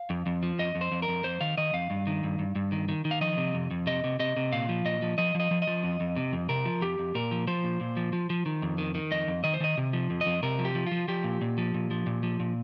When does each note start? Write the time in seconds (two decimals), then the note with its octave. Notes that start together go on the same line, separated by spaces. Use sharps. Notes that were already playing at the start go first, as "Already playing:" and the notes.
Already playing: F5
0.10 F2
0.26 F2
0.43 F3
0.59 F2 D#5
0.75 F2
0.81 C5
0.92 F2
1.02 A#4
1.08 F2
1.24 F2 C5
1.41 D#3 F5
1.58 D#3 D#5
1.73 F2 F5
1.90 G2
2.07 D#3
2.23 G2
2.39 G2
2.55 G2
2.72 D#3
2.89 D#3
3.05 D#3
3.11 F5
3.21 F3 D#5
3.37 C3
3.54 F2
3.71 F2
3.87 C3 D#5
4.04 C3
4.19 C3 D#5
4.36 C3
4.53 A#2 F5
4.69 F3
4.85 A#2 D#5
5.02 F3
5.18 F3 D#5
5.35 F3 D#5
5.51 F3
5.62 D#5
5.67 F3
5.83 F2
6.00 F2
6.16 C3
6.33 F2
6.49 C3 A#4
6.65 F3
6.81 F2 G4
6.99 F2
7.15 A#2 A#4
7.31 F3
7.47 F3 C5
7.64 A#2
7.81 A#2
7.97 F3
8.13 F3
8.30 F3
8.46 D#3
8.62 F2
8.78 D#3
8.95 D#3
9.11 F2 D#5
9.28 F2
9.44 D#3 D#5
9.54 C5
9.60 D#3 D#5
9.77 C3
9.93 F3
10.10 F2
10.21 D#5
10.26 F2
10.43 C3 A#4
10.59 F3
10.65 G4
10.75 F3
10.87 F4
10.92 F3
11.08 F3 G4
11.24 A#2
11.41 A#2
11.58 F3
11.74 A#2
11.91 F3
12.06 A#2
12.23 F3
12.40 A#2